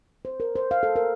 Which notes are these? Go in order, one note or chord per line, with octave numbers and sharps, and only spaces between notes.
C5
A#4
C5
F5
A4
A#4